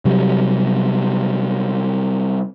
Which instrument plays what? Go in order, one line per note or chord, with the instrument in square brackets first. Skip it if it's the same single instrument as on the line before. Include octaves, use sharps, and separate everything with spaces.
[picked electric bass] C3 F#3 G3